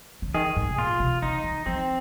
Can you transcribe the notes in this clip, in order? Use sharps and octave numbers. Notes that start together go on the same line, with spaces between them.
C#3
D#3 G#4
G#2
C3
A#2 F4
C3
C#3 D#4
D#3
F3 C4